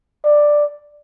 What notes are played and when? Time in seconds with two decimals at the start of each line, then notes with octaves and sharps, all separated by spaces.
0.25 D5